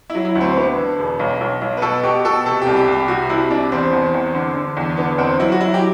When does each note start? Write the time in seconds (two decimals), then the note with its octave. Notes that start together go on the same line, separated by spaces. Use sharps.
0.10 E4
0.15 F#3
0.25 E4
0.35 D2
0.41 C4
0.57 D3 B3
0.77 D3
0.99 E1
1.19 B1
1.40 B1
1.62 B1
1.77 B4
1.82 B2 A4
2.03 B2 G4
2.25 B2 A4
2.46 C3 A4
2.62 C2 G4
2.77 G4
2.87 C2 G4
3.08 C3 F#4
3.29 C3 E4
3.50 C2 D4
3.72 E2 C4
3.92 E2
4.14 E2
4.35 D3
4.56 D3
4.77 E2
4.97 D3 B3
5.18 E2 C4
5.40 F#3 E4
5.52 F#4
5.61 F#3 E4
5.74 G4